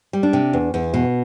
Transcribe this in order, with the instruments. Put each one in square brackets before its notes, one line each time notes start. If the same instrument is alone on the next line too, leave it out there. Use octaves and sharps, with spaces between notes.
[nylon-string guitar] G3
D4
C3
E2
E2
B2